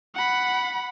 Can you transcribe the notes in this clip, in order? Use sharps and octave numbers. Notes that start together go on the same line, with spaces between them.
F#5 B5